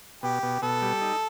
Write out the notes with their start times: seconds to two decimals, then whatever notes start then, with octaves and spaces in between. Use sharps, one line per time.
0.23 B2 G4
0.43 B2
0.62 B2 A4
0.82 G3
1.01 D#4